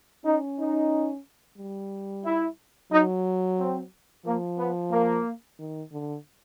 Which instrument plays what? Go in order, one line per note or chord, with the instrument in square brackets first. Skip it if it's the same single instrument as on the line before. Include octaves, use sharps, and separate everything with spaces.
[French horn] C#4 [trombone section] D#4
[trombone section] D#4
[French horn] G3
[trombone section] E4
[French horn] F#3 [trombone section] D#4
[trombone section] C4
[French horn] F3 [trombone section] A#3
[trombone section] B3
A#3
[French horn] D#3
D3